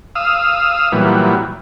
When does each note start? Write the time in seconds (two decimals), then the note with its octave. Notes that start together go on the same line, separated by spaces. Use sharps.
0.15 F5 D#6 E6
0.92 A#2 E3 F#3 G3 B3